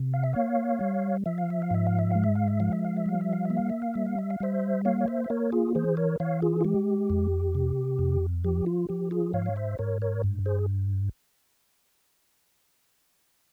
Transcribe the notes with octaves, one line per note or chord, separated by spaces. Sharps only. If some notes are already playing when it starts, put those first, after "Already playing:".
Already playing: C3
F5
E5
A#3 C#5 F5
G3
F3 E5
F5
E5
F5
G#2 E5
F5
E5
G#3 F5
E5
F5
E5
F3 F5
E5
F5
E5
G3 F5
E5
F5
A#3 E5
F5
E5
F5
G3 E5
F5
E5
F5
G3 C5 E5
A#3 C#5 F5
C#5
C5 E5
E5
A#3 A#4 C#5
F4 G#4
E3 G#4 C5
A#4 C#5
E3 C#5 F5
F4 G#4
F4
G#3 G4
F2
C3
F2
F3 G4
F4
F3 G4
F4 G#4
G#2 C#5 F5
C#5
C5 E5
G#2 A#4 C#5
A#4 C#5
G2
G#4 C5